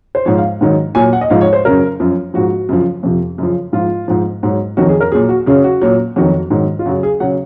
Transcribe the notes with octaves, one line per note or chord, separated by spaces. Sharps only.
C5
G#2 F3 C#5
F5
G#2 D#3 F#3
A#2 F#3 G#5
F#5
D#5
G#2 F3 F5
C#5
C5
F#2 C#3 F#3 A#4
F#2 F3
G#2 F3 F#4
F#2 C#3 F3
F2 C3 F3
F#2 C#3 F3
G#2 F3 F4
G#2 F3
G#2 F#3
F2 D#3 F#3 F#4
G#4
A#4
A#2 F#3 G#4
F#4
F#2 C#3 F#3 G#4
F#4
A#2 F#3
F2 D#3 F#3 F#4
G#2 D#3 F#3
F4
F#2 C#3 F#3 F#4
G#4
C#3 F#3 F#5